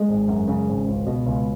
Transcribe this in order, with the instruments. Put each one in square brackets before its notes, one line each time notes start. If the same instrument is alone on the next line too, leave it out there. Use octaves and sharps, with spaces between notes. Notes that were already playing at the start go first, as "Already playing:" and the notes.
Already playing: [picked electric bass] G#3
G#1
F#2
C#3
G#1
C#2
B2
C#2